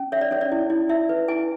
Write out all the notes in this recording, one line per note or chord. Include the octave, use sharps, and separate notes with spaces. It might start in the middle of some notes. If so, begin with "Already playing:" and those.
Already playing: C#4
C#5 E5
D5
C#4 C#5
D5
E4
E4
E4 E5
B4
E4 G#5